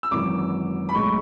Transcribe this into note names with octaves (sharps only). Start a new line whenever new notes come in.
E6
G#1 F#2 E3 D6
B5
B1 A2 G#3 C#6